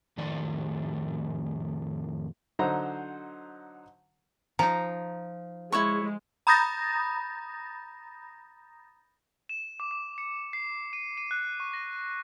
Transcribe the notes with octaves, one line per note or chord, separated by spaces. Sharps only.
F2 A2 D#3 D5
D3 F#3 D#4 C5 A#5
F3 D#4 A#5
G#3 E4 C#5 C#6
A#5 B5 D#6 G6 A6 A#6
E7
D6
D6
C#7
C7
D#7
D#7
F#6
C#6
A#6